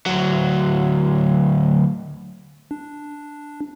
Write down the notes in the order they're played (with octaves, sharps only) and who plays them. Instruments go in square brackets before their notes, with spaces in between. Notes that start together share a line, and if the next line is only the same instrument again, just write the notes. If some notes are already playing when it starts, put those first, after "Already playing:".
[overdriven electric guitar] D2 F#3
[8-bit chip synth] D4